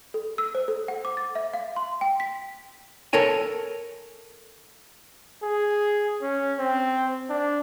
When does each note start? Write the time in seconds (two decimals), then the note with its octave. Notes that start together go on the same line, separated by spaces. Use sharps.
0.14 A4
0.38 E6
0.55 C5
0.68 A4
0.88 F#5
1.05 D6
1.17 A6
1.35 E5
1.54 F5
1.76 C6
2.01 G5
2.20 B6
3.13 A4 A#4 C#5 G#5
5.44 G#4
6.22 C#4
6.59 C4
7.30 D4